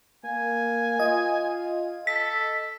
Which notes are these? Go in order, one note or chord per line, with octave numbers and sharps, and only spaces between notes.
A#3 G#5
F4 D#5
A4 B6